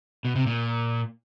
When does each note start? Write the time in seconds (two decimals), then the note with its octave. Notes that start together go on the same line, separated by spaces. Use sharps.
0.25 B2
0.36 C3
0.47 A#2